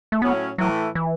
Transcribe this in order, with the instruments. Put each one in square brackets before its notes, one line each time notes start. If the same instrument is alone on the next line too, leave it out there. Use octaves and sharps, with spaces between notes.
[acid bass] A3
[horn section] A2 F#3 C#4 [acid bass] B3
[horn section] A2 E3 A3 [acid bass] F#3
[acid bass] E3